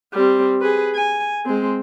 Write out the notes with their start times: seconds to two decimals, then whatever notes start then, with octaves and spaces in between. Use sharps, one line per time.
0.14 G3 C4
0.61 G#4 B4
0.95 G#5
1.46 G#3 C4